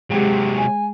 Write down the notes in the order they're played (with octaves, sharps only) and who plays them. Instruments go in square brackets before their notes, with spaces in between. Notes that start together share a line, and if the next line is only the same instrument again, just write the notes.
[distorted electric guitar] C3 F#3 [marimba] G#3 G#4 [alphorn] G4
[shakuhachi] G#5